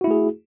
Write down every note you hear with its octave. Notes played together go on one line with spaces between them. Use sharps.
A3 E4 F#4 G#4